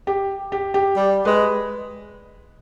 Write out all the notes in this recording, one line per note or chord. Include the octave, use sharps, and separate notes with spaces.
G4
G4
G4
G3
G#3 B4